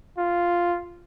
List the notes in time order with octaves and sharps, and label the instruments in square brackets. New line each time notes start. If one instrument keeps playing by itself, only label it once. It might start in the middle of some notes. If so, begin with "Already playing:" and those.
[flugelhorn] F4